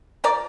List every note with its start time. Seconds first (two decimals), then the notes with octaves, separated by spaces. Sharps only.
0.24 F3 A#4 D5